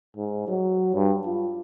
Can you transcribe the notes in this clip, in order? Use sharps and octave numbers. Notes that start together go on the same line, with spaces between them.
G#2
F#3
G2
F4